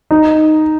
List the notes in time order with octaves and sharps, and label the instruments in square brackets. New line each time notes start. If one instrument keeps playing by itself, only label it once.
[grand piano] D#4